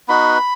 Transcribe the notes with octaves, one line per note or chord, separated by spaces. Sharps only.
B3 D#4 F#4 B4 B5